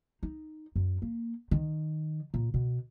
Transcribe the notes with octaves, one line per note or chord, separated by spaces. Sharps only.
D#4
F#2
A#3
D#3
A#2
B2